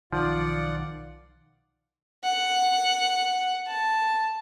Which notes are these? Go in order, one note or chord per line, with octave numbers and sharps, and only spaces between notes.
B1 D#3 F3 F4 D5 F#5
F#5
A5